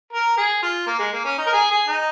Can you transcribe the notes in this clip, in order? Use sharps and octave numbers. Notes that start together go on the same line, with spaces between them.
A#4
G#4
F4
A#3
G#3
A#3
C#4
D#4
A#4
G#4
G#4
D#4